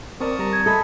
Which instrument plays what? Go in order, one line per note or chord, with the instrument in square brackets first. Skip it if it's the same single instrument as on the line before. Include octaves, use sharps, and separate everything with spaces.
[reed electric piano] C4 A#4 D5 [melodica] A5 C#6 D#6
[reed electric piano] G3 A#5
[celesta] G#6
[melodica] E4 D#5 E5 [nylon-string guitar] A4